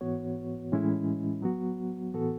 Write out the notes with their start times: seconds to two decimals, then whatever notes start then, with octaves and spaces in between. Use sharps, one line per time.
0.01 G#2 E3 B3 F#4 C#5
0.72 A2 E3 G#3 C#4 E4
1.42 F#3 B3 F#4
2.14 A2 E3 B3 F#4 A4